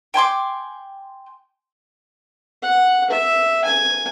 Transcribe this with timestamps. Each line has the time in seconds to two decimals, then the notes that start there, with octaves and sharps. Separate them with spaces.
0.14 G5 G#5 C6 D6
2.62 F#5
3.10 E5
3.65 G#5